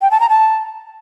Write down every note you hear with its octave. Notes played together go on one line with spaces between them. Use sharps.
G5
A5
A#5
A5